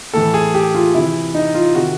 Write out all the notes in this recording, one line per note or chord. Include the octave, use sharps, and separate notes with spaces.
A2 E3 A4
G#4
G4
F4
C3 E3 E4
D#4
F4
C3 D#3 F#4